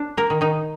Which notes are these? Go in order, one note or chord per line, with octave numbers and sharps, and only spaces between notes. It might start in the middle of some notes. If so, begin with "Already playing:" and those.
Already playing: D4
A#3 A#4
D#3
D#3 D#4